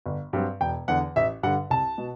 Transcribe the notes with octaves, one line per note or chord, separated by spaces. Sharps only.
G1
G2 F#3 C4
E1 G5
E2 D3 F#5
A1 E5
G2 D3 F#5
C2 A5
B2